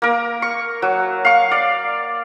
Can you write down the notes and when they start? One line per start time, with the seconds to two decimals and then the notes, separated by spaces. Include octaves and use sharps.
0.02 A#3 A#4
0.42 C#6
0.82 F#3
1.25 F5 C#6
1.51 D5